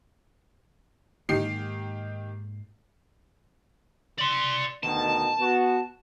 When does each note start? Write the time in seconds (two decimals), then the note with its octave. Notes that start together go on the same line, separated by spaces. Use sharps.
1.29 G#2 D#3 A#3 G4 C7
4.19 D5 C6
4.83 D2 B2 D#3 A5
5.39 B3 F#4